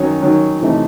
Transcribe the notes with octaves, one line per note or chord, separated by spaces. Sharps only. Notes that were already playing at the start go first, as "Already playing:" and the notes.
Already playing: D#3 F#3 C#4
D#3 F#3 C#4
C3 E3 A3 D#4